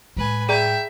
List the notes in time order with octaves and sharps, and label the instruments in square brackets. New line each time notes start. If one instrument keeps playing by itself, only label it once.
[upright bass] A2 G#3 [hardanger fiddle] B4 G#5
[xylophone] G#4 D5 A#5 [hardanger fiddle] E5 [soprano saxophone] G5